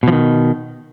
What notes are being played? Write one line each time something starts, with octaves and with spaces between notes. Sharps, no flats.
B2 D#3 F3